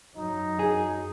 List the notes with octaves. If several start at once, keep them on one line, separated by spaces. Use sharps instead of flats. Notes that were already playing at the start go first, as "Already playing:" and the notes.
F#2 F#3 D#4
G#4